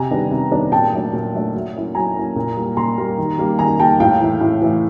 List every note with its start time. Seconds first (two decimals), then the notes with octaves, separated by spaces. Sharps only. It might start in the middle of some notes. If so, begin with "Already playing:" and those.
Already playing: C3 G#5 A#5
0.11 D#3 G3 B3 D4
0.31 C3
0.51 D#3 G3 B3 D4
0.72 A#2 G5 A5
0.92 F#3 A3 D4
1.13 A#2
1.33 F#3 A3 D4
1.54 F#3
1.74 A#3 C#4 E4
1.95 F#3 G#5 A#5
2.15 A#3 C#4 E4
2.36 A#2
2.56 G3 A#3
2.77 A#2 A#5 C6
2.98 G3 A#3
3.18 D#3
3.38 G3 A#3
3.59 D#3 G#5 A#5
3.79 G3 A#3 G5 A5
4.00 A2 F5 G5
4.21 E3 A3
4.41 A2
4.62 E3 A3